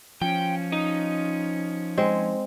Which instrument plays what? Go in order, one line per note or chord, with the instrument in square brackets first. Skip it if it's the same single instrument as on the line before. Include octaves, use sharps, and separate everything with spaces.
[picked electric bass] F3 [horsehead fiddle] C#4 [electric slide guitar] G5
[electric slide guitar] D#4 D#5
[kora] G#3 C4